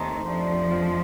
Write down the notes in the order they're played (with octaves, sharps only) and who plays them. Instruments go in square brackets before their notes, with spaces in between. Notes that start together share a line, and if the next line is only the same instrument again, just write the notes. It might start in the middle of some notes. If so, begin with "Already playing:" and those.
Already playing: [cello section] D#2 D#3 [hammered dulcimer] A3 C4 D#4
[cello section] F2 F3 [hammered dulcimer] A3 D4 G4 C5
[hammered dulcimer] G#3 C4 F4